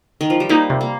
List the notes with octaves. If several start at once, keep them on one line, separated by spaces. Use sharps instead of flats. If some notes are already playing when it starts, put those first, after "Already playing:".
D#3
F3
G3
A#3 D#4
C3
A#3